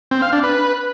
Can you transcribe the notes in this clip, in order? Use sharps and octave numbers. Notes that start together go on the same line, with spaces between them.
C4
F5
D4
B4